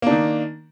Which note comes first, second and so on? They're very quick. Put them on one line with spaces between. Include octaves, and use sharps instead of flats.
A#3 D4 D#3